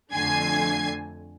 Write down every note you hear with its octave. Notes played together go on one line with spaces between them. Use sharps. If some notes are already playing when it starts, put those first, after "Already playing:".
F2 D3 A3 G#5 G#6 C7